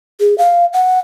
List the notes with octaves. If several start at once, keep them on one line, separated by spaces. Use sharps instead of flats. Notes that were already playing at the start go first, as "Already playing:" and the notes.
G#4
F5
F#5